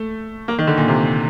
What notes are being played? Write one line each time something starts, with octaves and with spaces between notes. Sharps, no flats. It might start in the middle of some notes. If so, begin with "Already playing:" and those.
Already playing: A3
A#3
D#3
D3
A#2
C3